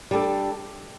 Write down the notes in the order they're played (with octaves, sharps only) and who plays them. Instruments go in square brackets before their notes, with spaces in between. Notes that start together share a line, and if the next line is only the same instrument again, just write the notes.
[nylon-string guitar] G3 D4 A4